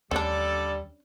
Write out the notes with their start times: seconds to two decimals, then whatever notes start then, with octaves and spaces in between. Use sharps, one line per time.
0.11 D#2 D3 G3 A3 C#4 D4 A4 D5